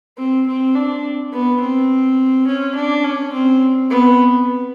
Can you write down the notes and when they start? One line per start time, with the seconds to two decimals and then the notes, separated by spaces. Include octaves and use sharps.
0.17 C4
0.47 C4
0.75 D4
1.32 B3
1.61 C4
2.47 C#4
2.75 D4
3.04 C#4
3.33 C4
3.90 B3